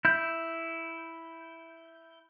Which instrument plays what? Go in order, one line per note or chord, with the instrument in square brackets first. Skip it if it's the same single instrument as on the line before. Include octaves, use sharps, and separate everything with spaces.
[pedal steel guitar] E4 G6